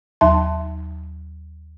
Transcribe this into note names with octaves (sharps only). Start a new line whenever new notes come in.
D#2 F#3 D#4 E5 A5 C6